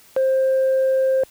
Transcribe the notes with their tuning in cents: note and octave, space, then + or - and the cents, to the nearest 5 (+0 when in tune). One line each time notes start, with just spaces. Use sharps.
C5 +15